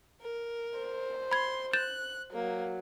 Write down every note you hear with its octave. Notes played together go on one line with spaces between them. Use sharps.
A#4
C5
B5 C6 G#6
F#6 G6 A6 E7
F#3 A#3